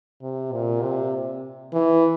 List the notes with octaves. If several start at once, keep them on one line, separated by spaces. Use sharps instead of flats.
C3
A#2
C3
E3